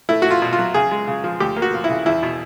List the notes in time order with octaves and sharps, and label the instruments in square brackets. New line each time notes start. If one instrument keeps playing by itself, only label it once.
[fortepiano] A3 E4
A3 F#4
F4
B2
F4
F#3
C#3 G#4
G#3
C#3
F3
D2 G4
A#3
F#4
F3
E4
C#3
E2 E4
B2